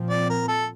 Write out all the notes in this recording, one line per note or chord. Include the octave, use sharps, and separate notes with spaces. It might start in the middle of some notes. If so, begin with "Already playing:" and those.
Already playing: A#2 F3 C4
D5
A#4
A4